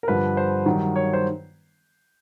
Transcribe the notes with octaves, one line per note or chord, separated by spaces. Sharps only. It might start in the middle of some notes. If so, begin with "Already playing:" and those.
A#4
G2 D3 F3 B4
C5
G2 D#3 F#3
C#5
C5